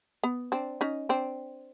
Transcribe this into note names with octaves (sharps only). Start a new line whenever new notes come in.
B3
C4 D4
C#4 D#4
C4 D4